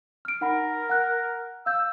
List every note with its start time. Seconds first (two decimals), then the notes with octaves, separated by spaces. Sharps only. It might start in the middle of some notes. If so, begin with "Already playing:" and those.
0.25 F6 D7
0.41 D#4 A#4 F#5 B5
0.90 F#5 F#6
1.66 F5 E6 G6